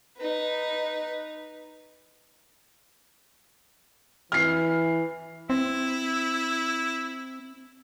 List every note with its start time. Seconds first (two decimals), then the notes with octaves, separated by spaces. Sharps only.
0.17 D#4 B4
4.32 E3 F6 C7
5.50 C4 E4